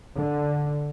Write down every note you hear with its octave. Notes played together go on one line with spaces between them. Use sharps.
D3